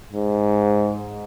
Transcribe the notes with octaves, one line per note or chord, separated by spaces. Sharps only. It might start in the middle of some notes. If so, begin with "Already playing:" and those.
G#2